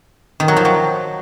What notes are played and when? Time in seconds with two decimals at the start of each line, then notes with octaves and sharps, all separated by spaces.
0.40 D#3
0.48 F#3
0.57 F3
0.65 F#3